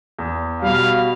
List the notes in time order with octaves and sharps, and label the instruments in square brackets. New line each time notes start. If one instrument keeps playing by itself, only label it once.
[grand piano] E2
[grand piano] B2 G3 [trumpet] F5